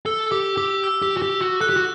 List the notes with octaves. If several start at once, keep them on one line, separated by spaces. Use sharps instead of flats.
A4 E6
G4 D6
G4 D6
E6
G4
F#4
G4
F#4
A4 F#6
G4
F#4